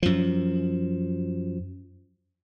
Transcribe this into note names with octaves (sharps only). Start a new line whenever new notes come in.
F#2 F3